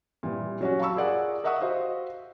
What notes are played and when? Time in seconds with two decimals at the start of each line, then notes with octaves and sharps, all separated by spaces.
0.23 A#2 E3 G3
0.61 F#3 C#4 F#4
0.79 F5 A5 B5 C#6 E6
0.96 F4 G#4 A#4 D5 F#5
1.44 A#4 D#5 E5 F#5 C#6 D#6
1.61 F#4 C5 D#5 F5